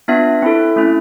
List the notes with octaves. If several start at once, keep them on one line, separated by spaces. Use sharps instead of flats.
B3 D4 F4 E5
C4 E4 A4
A3 C#4 E4